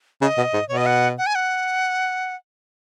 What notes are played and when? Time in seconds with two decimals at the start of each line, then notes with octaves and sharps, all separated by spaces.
0.22 C#3 D#5
0.38 B2
0.54 G#2
0.69 B2 C#5
0.77 D#5
0.86 F#5
1.18 F#5
1.26 G#5
1.35 F#5